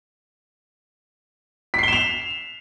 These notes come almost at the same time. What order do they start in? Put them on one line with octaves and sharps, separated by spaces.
B6 C7 G7 E7 F7